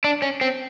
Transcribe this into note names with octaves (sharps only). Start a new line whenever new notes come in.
D4
C#4
C4